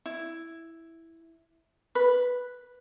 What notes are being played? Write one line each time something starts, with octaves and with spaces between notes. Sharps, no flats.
E4
B4